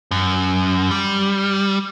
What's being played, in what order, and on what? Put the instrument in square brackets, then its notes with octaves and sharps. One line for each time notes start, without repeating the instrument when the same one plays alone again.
[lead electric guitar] F#2
G3